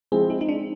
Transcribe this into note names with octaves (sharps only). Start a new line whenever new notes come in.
F3 G#3 C4 E4 G#4
D#4
D#4
D4